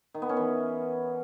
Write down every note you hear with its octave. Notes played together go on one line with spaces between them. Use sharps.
D#3
B3
C#4
E3